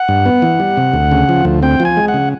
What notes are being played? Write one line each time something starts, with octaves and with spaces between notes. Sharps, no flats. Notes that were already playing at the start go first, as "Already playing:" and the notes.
Already playing: F#5
G2
B3
E3
G3
C3
D2
C#3
F3
D2
C4 G5
F3
G#5
G#3
F#5
C#3